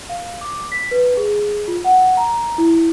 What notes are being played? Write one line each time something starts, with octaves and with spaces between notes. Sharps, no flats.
F5
D6
B6
B4
G#4
F4
F#5
A#5
E4